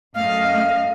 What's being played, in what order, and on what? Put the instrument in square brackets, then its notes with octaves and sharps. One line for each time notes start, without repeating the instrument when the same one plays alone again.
[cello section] F#2 A3 D#5 [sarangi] F5 [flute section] F6